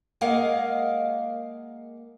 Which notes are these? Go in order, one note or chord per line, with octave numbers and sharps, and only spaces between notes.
G#3 A#3 A#4 D#5 F5 F#5